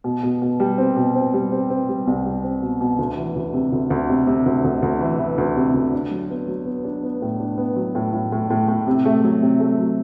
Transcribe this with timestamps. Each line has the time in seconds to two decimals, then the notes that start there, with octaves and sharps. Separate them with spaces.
0.04 B2
0.23 B2
0.42 B2
0.60 G3
0.78 C4
0.96 B2
1.15 C4
1.34 G3
1.52 C4
1.70 C4
1.89 G3
2.07 C2
2.25 G3
2.44 C4
2.62 B2
2.81 B2
2.99 D2
3.17 E3
3.36 D2
3.53 C3
3.73 D2
3.90 D2
4.09 C3
4.27 C3
4.46 D2
4.64 D2
4.82 D2
5.01 E3
5.19 E3
5.38 D2
5.56 C3
5.74 D2
5.92 D4
6.11 F#3
6.30 B3
6.48 F#3
6.66 B3
6.84 D4
7.03 B3
7.22 A2
7.40 D4
7.58 B3
7.76 F#3
7.95 A2
8.13 A2
8.32 A2
8.50 A2
8.68 A2
8.87 C3
9.05 A3
9.24 F#3
9.42 C3
9.60 A3
9.79 F#3